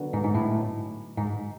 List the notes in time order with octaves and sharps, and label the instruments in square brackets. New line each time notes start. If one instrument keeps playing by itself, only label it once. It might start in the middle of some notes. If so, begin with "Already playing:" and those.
Already playing: [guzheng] D3 F#3 B3
[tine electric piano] G#2
G#2
A2
G#2